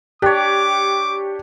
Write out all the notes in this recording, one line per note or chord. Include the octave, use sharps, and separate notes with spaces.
D4 G4 C#5 D6